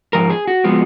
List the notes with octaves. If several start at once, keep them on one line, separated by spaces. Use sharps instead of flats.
G#2 F3 A#4
G#4
F#4
F3 G#3 B3